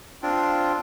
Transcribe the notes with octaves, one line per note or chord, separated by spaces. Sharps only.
C4 D4 F4